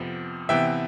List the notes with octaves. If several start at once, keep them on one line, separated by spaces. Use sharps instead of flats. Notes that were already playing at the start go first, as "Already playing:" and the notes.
Already playing: F2 C3 F3 B3
C3 E3 B3 E5 G5